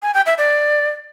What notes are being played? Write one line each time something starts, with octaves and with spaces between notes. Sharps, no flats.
G#5
G5
E5
D5